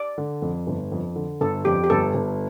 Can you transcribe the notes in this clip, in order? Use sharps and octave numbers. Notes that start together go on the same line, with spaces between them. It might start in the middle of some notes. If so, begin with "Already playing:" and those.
Already playing: D5
D3
F2
G1
F2
D3
G1 A4
F2 G4
G4
G1 A4
G1